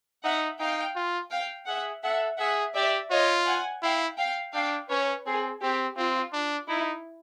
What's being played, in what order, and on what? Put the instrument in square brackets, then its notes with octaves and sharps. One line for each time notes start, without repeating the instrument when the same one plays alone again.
[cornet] D#4 [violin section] E5 F#5
[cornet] D#4 [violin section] F5 G5
[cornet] F4
[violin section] F5 G5
[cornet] G#4 [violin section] E5 F#5
[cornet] A4 [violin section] E5 F#5
[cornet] G#4 [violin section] E5 F#5
[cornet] G4 [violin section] D5 E5
[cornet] F4 [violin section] C#5 D#5
[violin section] F#5 G#5
[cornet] E4 [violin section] F5 G5
[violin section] F5 G5
[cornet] D4 [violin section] F5 G5
[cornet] C#4 [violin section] B4 C#5
[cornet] C4 [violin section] G#4
[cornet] C4 [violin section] G4
[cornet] C4 [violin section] F4
[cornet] D4
[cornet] D#4 [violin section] E4